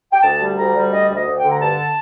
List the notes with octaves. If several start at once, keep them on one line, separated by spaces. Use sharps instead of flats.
G5
D2 A5
G3
D2 A#5
G3
D2 D#5
D2
D#5
D2
G5
D3
A#5
G2 A5